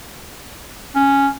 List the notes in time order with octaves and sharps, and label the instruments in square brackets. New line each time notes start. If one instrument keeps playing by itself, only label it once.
[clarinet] C#4